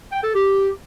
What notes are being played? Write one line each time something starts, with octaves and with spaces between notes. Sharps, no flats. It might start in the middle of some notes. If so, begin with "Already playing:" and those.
G5
A4
G4